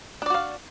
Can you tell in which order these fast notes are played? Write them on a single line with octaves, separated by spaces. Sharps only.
D4 D5 F#4 F5